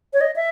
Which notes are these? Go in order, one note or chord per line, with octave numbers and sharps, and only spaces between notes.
C#5
D#5
E5